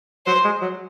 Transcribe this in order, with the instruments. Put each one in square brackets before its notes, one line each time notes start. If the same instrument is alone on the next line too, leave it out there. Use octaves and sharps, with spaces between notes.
[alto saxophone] F#3 [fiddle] C5
[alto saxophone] G#3
F#3